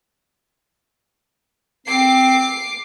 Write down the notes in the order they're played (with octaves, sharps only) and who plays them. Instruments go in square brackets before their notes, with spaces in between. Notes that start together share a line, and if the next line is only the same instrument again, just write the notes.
[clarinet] C4 [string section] D6 C7